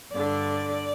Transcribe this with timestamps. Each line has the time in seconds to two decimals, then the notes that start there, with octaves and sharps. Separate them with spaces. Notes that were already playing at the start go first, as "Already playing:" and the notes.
0.12 G2 D3 D5